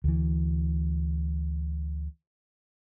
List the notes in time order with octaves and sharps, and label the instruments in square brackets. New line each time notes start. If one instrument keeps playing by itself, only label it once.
[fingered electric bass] D2 E3